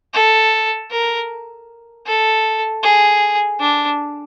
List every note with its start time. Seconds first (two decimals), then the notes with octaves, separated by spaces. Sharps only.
0.14 A4
0.91 A#4
2.06 A4
2.83 G#4
3.60 D4